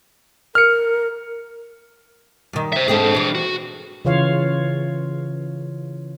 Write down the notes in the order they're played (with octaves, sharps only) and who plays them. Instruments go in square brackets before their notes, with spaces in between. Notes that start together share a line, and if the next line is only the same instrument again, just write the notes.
[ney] A#4 [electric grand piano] F6 C#7
[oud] G2 D#3
[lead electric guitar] C5 E5
[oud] G#2 C4 A4 [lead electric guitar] D4 G#4
[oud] E3 G3
[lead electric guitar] F#4
[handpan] C#3 E3 F4 C#5 F5